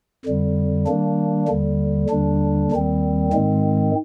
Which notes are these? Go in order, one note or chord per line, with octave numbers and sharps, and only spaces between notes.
F2 D3 G3
D#3 G3 A#3 D4
D#2 D3 G3
D#2 D3 G3 D4
D#2 D#3 G3 C4
G#2 D#3 G#3 C4